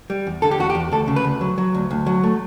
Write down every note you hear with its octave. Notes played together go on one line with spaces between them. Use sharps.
G3
E2
D3 A4
G4
E2 F#4
G4
E2
D2 A4
C#3
B4
D2
F#3
F#3
D2
D2
F#3
A3